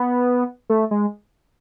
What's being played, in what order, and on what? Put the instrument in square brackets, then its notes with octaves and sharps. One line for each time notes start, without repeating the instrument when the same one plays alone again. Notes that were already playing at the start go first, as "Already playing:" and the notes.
Already playing: [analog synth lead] B3
A3
G#3